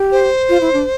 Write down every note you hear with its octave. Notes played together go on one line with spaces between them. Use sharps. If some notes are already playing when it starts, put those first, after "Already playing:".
Already playing: G4
C5
F4
E4
D4